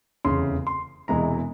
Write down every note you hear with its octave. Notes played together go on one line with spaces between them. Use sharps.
F1 E2 C#3 C6
C6
E1 E2 C3 E3 G#3 A#5